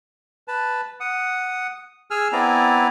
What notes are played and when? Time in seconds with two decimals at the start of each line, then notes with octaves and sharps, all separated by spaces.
0.48 B4 A5
1.00 F#5 D#6
2.11 G#4 G#5 E6 F6
2.33 B3 C4 E4 D5 G#5 A#5